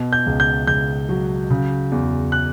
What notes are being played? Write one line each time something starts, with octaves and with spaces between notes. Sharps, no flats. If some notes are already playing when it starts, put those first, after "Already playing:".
Already playing: B2
G6
C#2
G6
C#2 G6
F#3
C#3
E2
F#6